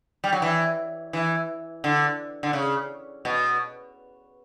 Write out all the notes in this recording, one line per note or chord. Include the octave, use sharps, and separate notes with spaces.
G3
F#3
E3
E3
D3
D3
C#3
B2